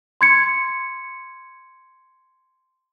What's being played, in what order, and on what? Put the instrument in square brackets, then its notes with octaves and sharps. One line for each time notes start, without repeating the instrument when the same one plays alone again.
[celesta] C6 G#6 C#7